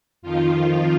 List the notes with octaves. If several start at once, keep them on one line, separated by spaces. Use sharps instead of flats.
F2 D#3 F3 F4